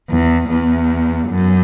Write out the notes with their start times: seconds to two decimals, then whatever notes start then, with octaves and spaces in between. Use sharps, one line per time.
0.10 E2
0.49 E2
1.29 F#2